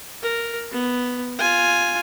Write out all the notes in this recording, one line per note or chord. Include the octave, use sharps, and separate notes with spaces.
A#4
B3
F4 G#5